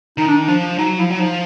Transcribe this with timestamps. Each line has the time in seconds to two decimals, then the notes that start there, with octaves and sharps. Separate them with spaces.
0.18 D#3 D#4
0.28 D4
0.47 F3 D4
0.78 F#3 D#4
0.99 F3 E4
1.10 F#3
1.19 F3 D#4